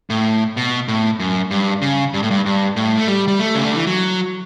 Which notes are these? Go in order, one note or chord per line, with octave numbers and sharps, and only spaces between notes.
A2
B2
A2
F#2
G2
C#3
G2
A2
G2
G2
A2
A3
G3
G3
A3
C#3
D3
E3
F#3